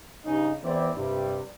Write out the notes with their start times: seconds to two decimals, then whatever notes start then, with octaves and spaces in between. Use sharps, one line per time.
0.25 G2 C#3 D#4
0.62 E2 C4 E4 D5
0.94 G2 C3 G3